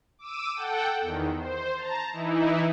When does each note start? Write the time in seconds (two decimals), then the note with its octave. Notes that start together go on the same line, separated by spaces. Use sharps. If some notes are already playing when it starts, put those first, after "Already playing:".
0.19 D6 E6 D#7
0.55 A4 F#5 G5
1.01 E2 D#3
1.36 C5
1.76 A5 A#5
2.13 E3 D#4 E4